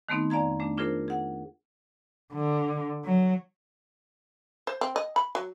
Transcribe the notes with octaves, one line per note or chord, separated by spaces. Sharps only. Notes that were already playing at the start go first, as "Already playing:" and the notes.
D#3 A3 B3 C4 D#4
F2 D5 F5 A#5 G#6
A3 D4
D4 F4 G#4 A#4 C5
G#4 F#5
D3
F#3
C5
C4
D#5
B5
F#3